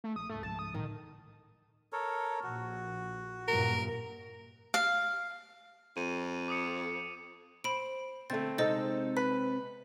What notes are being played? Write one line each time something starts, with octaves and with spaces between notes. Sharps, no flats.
A3
A#1 D#6
C#2 G#2 A3
C#3 F3 A5
D#6
A2 D3 D#3
A4 A#4 C#5
A#1 F#4
F#1 G2 A#2 A#4
F5
F2 D#7
D6 D#6 C#7
C5 B5 D7
D3 A3 C4 D4 A6
C3 G#3 C4 D#4 A4 C5 D#5 A6
B4 B6